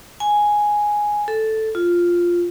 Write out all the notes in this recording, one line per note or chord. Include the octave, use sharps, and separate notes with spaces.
G#5
A4
F4